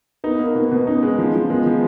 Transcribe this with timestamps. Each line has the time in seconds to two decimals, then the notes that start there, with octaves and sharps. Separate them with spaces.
0.24 B3 D#4
0.39 A#3
0.55 B2 B3
0.71 B2 B3
0.87 C#4 D#4
1.03 G#3
1.19 F3
1.35 F3
1.50 G#3 B3
1.66 F3